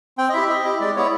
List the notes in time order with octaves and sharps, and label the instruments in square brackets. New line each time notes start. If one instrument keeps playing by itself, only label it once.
[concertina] C4 G5
D#5
E4 G4 E5
C4 D#5
E4 G4
G#3 D5
B3 E4 C#5